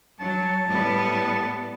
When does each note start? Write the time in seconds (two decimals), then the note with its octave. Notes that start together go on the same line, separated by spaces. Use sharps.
0.20 F#3 A5
0.65 A2 G3 B3